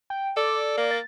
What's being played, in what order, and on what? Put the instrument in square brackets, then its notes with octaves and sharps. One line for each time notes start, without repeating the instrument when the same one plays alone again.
[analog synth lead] G5
[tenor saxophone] A4 [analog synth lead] D5
[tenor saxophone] A#3
[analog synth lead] A6